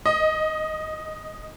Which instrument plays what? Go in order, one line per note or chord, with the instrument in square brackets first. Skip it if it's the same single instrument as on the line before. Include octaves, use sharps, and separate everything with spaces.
[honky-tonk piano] D#5